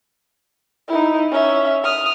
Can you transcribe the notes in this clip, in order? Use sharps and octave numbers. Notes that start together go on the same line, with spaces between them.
D#4 E4
C#4 E5
D#6 F6